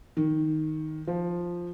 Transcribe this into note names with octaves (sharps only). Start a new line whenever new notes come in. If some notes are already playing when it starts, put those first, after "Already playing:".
D#3
F3